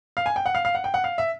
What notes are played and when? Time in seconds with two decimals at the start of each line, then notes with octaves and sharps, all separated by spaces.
0.17 F5
0.26 G#5
0.36 G5
0.46 F#5
0.55 F5
0.65 F5
0.75 F#5
0.84 G5
0.94 F#5
1.04 F5
1.18 E5